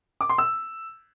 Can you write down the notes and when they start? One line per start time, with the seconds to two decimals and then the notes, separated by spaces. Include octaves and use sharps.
0.21 D6
0.29 C6
0.38 E6